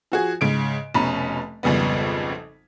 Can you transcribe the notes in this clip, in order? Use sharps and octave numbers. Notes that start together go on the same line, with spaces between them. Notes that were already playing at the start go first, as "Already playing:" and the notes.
F3 F#4 G#4
G#2 C#3 D7
F1 B2 C#4 A#5 B5
G#1 F2 C#3 G3 B3